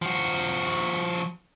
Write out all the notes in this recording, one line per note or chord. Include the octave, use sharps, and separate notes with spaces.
F3 F#4